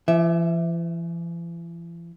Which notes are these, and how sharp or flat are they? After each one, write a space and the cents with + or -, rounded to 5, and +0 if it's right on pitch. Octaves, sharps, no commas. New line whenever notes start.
E3 +45 E5 +0